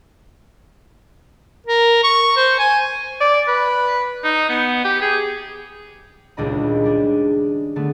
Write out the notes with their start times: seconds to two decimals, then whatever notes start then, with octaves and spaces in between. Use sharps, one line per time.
1.67 A#4
2.04 C#6
2.37 C5
2.59 G#5
3.21 D5
3.48 B4
4.24 D#4
4.50 B3
4.85 G4
5.02 G#4
6.37 D#1 C#2 D4 D#5 B5
6.84 G3 D4 G#4
7.76 D3 A3 B3